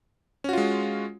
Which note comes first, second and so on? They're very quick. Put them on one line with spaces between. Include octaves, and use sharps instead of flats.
C#4 F#4 F4 G#3